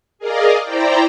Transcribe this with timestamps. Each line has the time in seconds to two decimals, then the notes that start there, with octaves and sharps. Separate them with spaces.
0.19 G#4 A#4 D5 D#5 F5
0.63 E4 C5 D5 G5 A#5